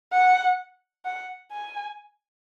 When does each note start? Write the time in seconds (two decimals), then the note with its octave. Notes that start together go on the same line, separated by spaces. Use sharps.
0.13 F#5
1.05 F#5
1.52 G#5